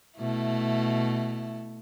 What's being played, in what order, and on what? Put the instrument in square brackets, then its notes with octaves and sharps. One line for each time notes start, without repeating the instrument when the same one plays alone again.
[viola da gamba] B2 A3 E4